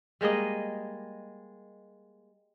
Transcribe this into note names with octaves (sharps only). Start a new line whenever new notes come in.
G3 G#3 A#3 D#5